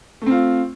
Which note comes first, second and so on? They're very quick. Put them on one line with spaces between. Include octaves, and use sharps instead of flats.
A3 C4 F4